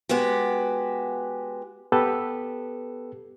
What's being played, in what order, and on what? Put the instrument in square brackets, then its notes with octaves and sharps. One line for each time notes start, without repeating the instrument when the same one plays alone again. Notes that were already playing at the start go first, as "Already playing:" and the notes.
[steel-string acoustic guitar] G#3 B3 F#4 G4
[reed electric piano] B3 G4 A4 B4